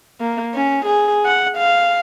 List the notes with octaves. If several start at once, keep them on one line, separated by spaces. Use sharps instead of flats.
A#3
C#4
G#4
F#5
F5